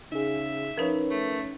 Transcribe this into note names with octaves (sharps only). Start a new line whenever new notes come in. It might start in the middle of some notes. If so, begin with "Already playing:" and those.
C#3 D#4 G#4 E5
F3 C#4 D#4 A#4 B4 C#5
A3